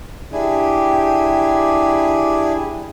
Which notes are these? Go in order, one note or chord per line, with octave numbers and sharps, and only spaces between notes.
D4 E4 G4 G#4